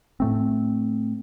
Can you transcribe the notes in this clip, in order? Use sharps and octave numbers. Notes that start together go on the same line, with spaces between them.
A2 A3 C4